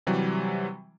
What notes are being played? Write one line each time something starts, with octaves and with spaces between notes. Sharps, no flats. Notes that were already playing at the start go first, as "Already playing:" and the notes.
C3 E3 F#3 G3